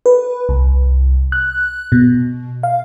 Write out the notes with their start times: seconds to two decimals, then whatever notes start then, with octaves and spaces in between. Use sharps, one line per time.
0.06 B4
0.49 C2
1.32 F#6
1.92 B2
2.63 F5